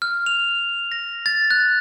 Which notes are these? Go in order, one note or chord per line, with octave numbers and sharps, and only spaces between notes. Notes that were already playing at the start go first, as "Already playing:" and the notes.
F6
F7
A#6
A6
F#6